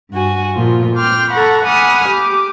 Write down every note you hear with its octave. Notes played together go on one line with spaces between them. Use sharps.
G2 F#4 G#5
A#2 F3 F4
G5 C6 D6 F6
A4 F#5 A#5 B5 C#6
F#5 G#5 B5 D6 D#6 F6
G4 D6